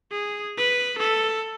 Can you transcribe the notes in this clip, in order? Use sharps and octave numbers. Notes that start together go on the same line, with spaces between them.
G#4
B4
A4